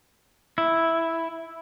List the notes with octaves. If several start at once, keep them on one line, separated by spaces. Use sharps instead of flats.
E4